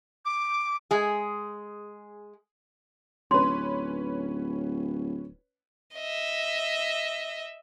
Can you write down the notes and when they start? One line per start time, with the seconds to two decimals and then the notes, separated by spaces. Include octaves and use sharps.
0.25 D6
0.91 G#3 G#4
3.31 D1 C#4 B4 C6
5.96 D#5 E5